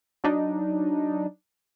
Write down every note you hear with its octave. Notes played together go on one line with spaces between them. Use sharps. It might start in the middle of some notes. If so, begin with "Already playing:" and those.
F#3 D4 D#4